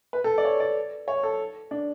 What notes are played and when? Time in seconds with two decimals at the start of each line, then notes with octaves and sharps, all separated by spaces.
0.13 B4
0.24 A4
0.38 D5
0.45 C#5
0.60 D5
1.08 C#5
1.23 A4
1.71 D4